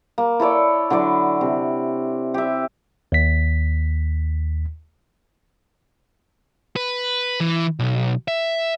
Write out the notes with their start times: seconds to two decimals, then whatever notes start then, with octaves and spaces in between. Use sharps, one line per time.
0.18 A#3
0.40 E4 A4 C#5 D5
0.90 D3 F#3 E4 D5
1.41 C3
2.34 G4 E5
3.12 D#2 B6
6.76 B4
7.40 E3
7.80 B1
8.28 E5